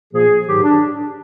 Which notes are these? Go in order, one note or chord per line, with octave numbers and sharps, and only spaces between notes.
A#2 F3 A#3 G#4
G#2 D#3 F#3 G4
D4